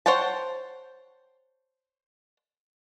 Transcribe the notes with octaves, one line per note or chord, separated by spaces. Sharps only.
C5 C#5 F#5 G5 A5